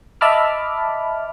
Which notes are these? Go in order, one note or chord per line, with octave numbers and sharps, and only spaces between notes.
D#5 E5 A5 B5 D6 F6